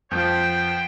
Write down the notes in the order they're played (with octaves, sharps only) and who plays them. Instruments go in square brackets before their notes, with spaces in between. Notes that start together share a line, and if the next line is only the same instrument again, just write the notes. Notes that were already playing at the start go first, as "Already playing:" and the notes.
[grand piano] F2 F3 [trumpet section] B3 C5 G5 [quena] G6